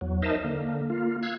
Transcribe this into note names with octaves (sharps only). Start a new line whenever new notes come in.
E2 F#3
D#4 A#4 C5 D#5 E5 A5
D3 A#3
A#3 F4
F5 E6 F#6 G#6